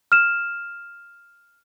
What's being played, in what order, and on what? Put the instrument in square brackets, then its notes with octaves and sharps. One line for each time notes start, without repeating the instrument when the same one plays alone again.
[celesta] F6 E7